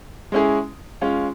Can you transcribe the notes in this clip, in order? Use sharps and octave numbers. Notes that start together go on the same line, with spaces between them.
G#3 C#4 E4 G#4
G#3 C#4 F4